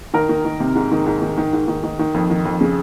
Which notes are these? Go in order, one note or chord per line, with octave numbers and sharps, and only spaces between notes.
D#3 A#4
D#3
D#3
C3
G#2
D#3
G#2
D#3
D#3
G#2
D#3
D#3
D#3
F2
D#3
F2
C#3